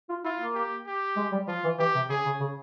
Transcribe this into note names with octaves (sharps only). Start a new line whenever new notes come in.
F4
E4 F4
A#3
G4
G4
G#3
G3
F3 F4
E3
E3 G4
C3
C#3 G#4
C#3
C#3